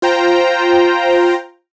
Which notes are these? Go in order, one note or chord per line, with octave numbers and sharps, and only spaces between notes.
F4 C5 G5 A#5